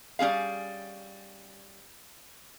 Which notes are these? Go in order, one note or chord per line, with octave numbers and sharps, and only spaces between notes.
G3 C#4 G#4 F5